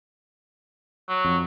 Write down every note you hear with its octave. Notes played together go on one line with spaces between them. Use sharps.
F#3
F2